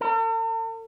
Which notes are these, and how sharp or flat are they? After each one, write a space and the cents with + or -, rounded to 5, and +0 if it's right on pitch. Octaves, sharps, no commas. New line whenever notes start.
A4 +45